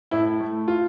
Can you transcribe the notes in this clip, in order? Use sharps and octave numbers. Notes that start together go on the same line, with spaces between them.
A2 E4
A3
F4